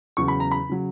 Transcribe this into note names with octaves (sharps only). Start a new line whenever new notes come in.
E2 C#3 F#3 C#6
B5
A#5
B5
C#3 F#3